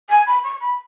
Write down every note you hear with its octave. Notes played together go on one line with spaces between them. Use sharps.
G#5
B5
C#6
B5